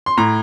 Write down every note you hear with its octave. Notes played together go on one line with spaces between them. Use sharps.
C6
A2 A#5